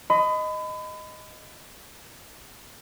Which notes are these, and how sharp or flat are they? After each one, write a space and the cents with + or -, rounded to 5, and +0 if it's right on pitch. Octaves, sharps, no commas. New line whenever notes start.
D#5 +0 B5 +35